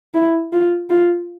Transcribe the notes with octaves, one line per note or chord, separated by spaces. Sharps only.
E4
F4
F4